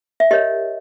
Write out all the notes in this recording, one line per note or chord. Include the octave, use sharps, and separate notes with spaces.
E5
G4 A#4 C#5 D#5